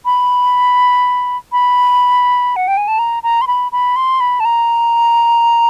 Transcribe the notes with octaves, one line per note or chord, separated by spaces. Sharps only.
B5
B5
F#5
G5
G#5
A5
A#5
A#5
C6
B5
B5
C6
B5
A5
A#5